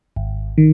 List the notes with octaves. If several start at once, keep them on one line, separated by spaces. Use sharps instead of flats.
G#1
D#3